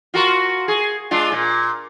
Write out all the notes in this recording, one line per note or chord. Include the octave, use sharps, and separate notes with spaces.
F4 F#4 A#4
G#4
G#3 D4 F4
A#2